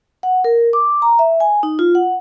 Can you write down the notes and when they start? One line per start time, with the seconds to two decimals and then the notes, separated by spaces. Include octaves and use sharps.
0.23 F#5
0.44 A#4
0.73 D6
1.02 A#5
1.19 E5
1.40 G#5
1.63 D#4
1.79 F4
1.95 F#5